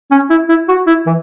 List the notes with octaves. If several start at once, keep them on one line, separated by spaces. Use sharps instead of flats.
C#4
E4
E4
F#4
E4
E3